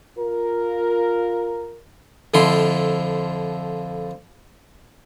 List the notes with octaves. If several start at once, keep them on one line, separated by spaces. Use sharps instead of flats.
F4 A#4
F2 D3 F3 E4 C6